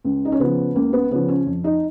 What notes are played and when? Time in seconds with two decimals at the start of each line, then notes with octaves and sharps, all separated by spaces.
0.04 C#2
0.25 D#4
0.32 C#4
0.39 C#3 F3 B3
0.75 C#2 A#3
0.93 B3
1.11 C#3 F3 B3
1.28 C#4
1.46 F2
1.64 D#4